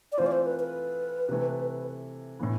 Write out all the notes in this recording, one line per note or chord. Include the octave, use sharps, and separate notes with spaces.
D5
E3 A3 C4 F4 C5
D5
C5
B4
B4
C3 E3 A3
A2 E3 B3